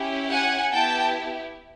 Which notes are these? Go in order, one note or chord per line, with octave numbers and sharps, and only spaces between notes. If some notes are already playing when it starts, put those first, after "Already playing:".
Already playing: C#4 E4 G4
F#5 G#5
B3 E4 G4 G5 A5